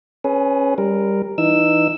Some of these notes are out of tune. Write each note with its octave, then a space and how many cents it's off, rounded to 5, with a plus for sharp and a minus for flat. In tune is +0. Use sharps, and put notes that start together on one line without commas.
C#4 -10 G#4 +30 B4 +0
G3 +15 A#4 +0
E3 +0 D#4 -20 E6 +0